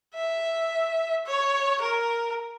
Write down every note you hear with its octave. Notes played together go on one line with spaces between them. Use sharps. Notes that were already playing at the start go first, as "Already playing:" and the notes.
E5
C#5
A#4